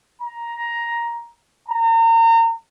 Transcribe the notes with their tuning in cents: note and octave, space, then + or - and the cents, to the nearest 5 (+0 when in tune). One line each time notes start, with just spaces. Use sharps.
A#5 +10
A#5 -35